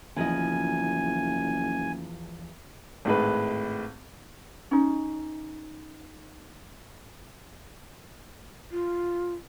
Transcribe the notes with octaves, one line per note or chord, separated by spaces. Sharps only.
F#1 E2 F3 D#5 G#5
G#1 A2 G#3 B4
C#4 D#4
F4